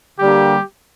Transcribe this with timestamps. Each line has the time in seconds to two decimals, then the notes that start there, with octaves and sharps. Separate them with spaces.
0.19 D3 G3 A#3 G4